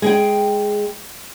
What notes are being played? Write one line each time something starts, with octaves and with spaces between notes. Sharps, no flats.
G#3 G#4 G5